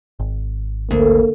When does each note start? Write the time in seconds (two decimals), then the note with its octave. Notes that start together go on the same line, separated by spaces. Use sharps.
0.20 G#1
0.91 D2 A#3